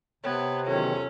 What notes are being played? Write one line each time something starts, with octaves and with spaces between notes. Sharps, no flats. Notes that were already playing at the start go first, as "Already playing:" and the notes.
C3 B3 C#5 G5 G#6
E2 D#3 F#3 C#4 F4 A4 F#5